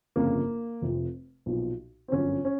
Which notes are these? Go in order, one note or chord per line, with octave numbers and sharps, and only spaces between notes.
G1 F2 C#3 F3 A#3
F1 F2 C3 F3
B1 A#2 F3
C4
G1 F#2 D3 F3 C#4
C#4